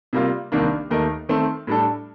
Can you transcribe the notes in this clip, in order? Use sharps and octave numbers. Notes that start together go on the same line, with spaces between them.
C3 G3 A#3 F4
C2 C3 D#3 A#3 D4
D#2 D#3 A3 D#4 A#4
D#3 A3 C4
A2 G3 D4 A4